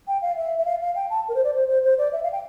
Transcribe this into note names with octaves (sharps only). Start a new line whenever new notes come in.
G5
F5
E5
E5
F5
F5
G5
A5
A#4
C5
D5
C5
C5
C5
D5
E5
F5
G5